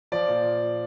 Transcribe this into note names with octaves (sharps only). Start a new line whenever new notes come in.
F3 D5
A#2